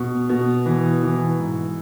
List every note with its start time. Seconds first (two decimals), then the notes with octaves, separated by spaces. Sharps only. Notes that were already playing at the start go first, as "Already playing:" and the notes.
Already playing: B2
0.29 B2
0.66 E3
1.03 E3
1.39 G#2